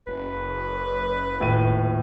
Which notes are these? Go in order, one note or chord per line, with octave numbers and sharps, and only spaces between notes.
F#1 B4
D#1 A2 D#7